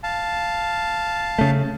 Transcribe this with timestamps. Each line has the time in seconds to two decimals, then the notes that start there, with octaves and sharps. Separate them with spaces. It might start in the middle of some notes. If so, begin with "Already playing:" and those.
0.03 F5 A5
1.38 C#3 A3